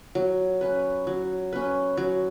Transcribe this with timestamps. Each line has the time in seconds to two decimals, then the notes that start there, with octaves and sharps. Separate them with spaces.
0.15 F#3
0.61 C#4 B4
1.07 F#3
1.53 C#4 B4
1.97 F#3